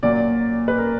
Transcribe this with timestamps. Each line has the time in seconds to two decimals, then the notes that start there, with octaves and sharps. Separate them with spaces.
0.03 A#2 F#3 A#3 D5
0.68 B4
0.78 A#4